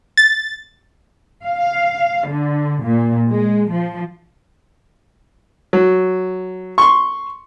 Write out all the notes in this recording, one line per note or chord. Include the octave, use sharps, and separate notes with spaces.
A6
F5
D3
A#2
G#3
F3
F#3
C6 C#6